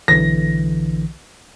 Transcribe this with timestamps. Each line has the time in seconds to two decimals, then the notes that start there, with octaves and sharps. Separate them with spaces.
0.08 B1 D3 E3 A#6